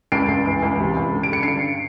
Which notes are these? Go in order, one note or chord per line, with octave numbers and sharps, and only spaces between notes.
C#2 C7 D7
C#2
E3
C#2
C3
C#2
D3
D7
D3 C#7
G2 C7 D7